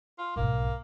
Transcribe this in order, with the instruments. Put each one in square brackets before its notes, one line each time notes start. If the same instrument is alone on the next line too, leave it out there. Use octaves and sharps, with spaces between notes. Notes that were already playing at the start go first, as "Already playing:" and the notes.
[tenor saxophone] F4
[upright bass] B1 G#2 [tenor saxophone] A#3